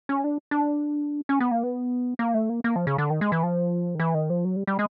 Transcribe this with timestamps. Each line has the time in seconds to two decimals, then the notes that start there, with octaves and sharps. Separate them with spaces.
0.09 C#4
0.24 D4
0.51 D4
1.29 C#4
1.40 B3
1.51 A#3
1.63 B3
2.19 A#3
2.34 A3
2.49 A#3
2.64 A#3
2.76 F3
2.87 C#3
2.98 D3
3.10 D#3
3.21 G#3
3.32 E3
3.43 F3
3.95 D#3
4.00 E3
4.14 D#3
4.30 F3
4.45 F#3
4.56 G3
4.67 G3
4.79 G#3